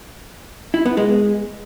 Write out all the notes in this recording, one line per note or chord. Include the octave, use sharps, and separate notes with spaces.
E4
B3
G#3